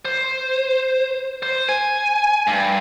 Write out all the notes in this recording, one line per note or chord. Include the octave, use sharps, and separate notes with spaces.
C5
C5
G#5
G2